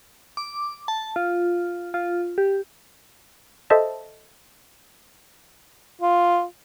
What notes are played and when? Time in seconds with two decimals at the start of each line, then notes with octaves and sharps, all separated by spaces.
0.37 D6
0.88 A5
1.16 F4
1.94 F4
2.38 G4
3.70 A4 C5 D#5 E5 A5
6.02 F4